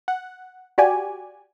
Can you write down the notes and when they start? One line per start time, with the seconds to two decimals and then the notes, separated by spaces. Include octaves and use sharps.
0.08 F#5
0.78 F#4 G4 D5 G#5